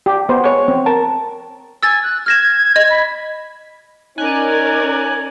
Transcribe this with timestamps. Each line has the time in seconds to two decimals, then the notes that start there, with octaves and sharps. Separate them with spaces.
0.06 G4
0.29 B3 C5
0.44 G#3 C#5
0.68 C4
0.86 A#4 A5
1.83 G#5 E6 A6
2.02 F#6
2.26 F6 G#6 A#6 E7
2.76 D#5
2.90 B5
4.18 C#4 D#4 A#4 D5 G#5 F#6